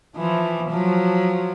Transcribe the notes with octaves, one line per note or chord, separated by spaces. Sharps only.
E3 F3
F3 F#3